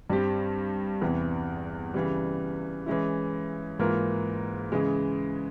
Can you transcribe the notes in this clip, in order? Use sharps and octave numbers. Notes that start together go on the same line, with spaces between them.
G2 G3 C4 G4
E2 C3 E3
C#3 E3 G3
E3 G#3 C#4 E4
G#2 E3 A#3 F4 A#4
C#3 E3 G#3